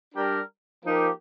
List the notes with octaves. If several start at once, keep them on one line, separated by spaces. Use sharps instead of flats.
G3 D4 G4 A#4
F3 A#3 D#4 G4 A#4